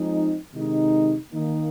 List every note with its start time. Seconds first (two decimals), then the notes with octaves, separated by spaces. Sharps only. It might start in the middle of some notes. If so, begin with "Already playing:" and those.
Already playing: F3 G#3 C4 D#4
0.53 C3 D#3 G#3 D#4
1.33 D#3 A#3 D#4